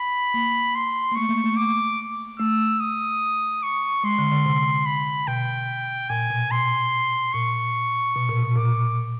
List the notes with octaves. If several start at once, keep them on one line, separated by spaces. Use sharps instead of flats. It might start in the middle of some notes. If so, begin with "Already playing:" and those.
Already playing: B5
A#3
C6
A#3
A3 C#6
A#3
A3
D6
A3 E6
D#6
C#6
G#3 C6
D3
D3
C3
B5
B2 G5
A#2 G#5
B2
B2 C6
A#2 C#6
B2
A#2
B2
A#2 D6